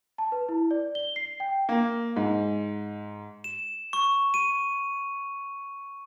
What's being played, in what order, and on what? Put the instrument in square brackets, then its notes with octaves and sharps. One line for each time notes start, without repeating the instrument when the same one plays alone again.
[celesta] A5
B4
E4
D5
G7
C7
G5
[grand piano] A#3
G#2
[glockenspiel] E7
C#6
D#7